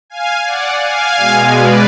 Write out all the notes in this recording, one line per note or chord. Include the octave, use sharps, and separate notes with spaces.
F5 G#5
D5 F#5
F5 G#5
B2 G#3
B4 D5